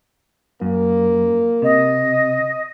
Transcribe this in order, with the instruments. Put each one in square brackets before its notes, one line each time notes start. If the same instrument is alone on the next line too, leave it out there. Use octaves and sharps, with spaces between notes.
[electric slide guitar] F#2 [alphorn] A#3
[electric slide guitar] C3 [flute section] D#5